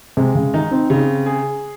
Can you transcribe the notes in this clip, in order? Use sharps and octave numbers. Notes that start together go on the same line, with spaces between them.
C3 G#3
C#3
D#3 D#4
C4
C#3
G#4